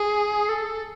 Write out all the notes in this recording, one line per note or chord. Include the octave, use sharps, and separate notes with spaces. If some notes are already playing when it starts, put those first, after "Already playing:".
Already playing: G#4
A4